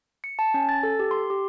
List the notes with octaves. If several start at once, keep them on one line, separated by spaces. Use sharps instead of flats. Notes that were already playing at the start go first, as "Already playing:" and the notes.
C#7
A5
C#4
A6
A4
G4
C6
G4